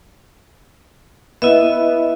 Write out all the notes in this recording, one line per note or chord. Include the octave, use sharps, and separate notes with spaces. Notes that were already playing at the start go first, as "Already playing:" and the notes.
B3 E4 D#5 E5